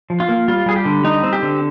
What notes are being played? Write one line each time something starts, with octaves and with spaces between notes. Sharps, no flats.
F3
F4
A#3
G3 F4
G3 G#4
G4
D3
G3 D#4
C4
G4
D3